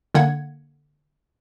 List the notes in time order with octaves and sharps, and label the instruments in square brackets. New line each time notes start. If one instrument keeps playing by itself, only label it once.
[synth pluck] D3 A#3 F#5 G#6